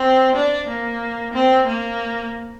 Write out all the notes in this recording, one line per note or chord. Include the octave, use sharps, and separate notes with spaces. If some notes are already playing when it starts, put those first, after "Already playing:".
Already playing: C4
D4
A#3
C4
A#3